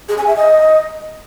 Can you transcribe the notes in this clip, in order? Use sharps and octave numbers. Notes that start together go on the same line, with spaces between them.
G#4
G#5
E5
D#5